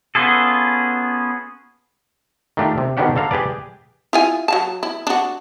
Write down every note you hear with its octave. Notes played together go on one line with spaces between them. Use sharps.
B3 C#4 F4 G#4 A4
D#3 A3 D4 F4 G4
C3
B2 D3 D#3 D4 G4 F#5
D3 A4 F5 A#5
G4 G#4 B4 D5
E4 F4 G#5
F#3 F5 A5
E4
D4 F#4